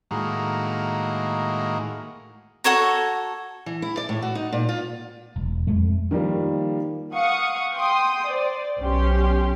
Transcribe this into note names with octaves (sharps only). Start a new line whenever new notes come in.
A2 D#3 G#3 A#3 F#4
F#4 A4 C#5 A#5
E3
E4
D5
A2
F#4
D#4
A#2
F4
E1
F2 G#3 A3
D#3 F3 G3 A#3
F5 F#5 C#6 D#6
G5 C6 D#6
C5 D5
B1 C#4 G4 C6